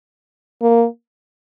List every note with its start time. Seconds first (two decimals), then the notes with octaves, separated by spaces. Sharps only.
0.62 A#3